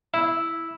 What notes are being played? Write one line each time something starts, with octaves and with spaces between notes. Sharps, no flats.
E4